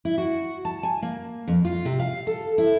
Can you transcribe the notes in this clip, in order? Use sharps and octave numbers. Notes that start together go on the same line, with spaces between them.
E4
F#4
A5
G#5
A#3
F2
F4
C3
F5
A4
E4